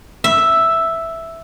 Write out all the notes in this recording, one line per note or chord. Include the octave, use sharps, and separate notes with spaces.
E5